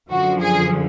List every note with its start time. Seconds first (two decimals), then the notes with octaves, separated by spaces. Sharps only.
0.10 F#2 D3 F3 F#4
0.40 G#4